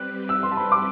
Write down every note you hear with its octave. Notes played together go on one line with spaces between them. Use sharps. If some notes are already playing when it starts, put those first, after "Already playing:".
Already playing: G3 C4 G4 B4 F#6
E6
C6
A5
B5
D6